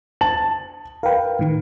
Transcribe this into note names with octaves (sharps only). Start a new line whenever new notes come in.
A5 F#7
A#4 B4 F5 G5
A2 D#3